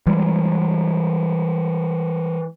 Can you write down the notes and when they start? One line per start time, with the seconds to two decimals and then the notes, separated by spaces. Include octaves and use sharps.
0.07 E3 G3 G#3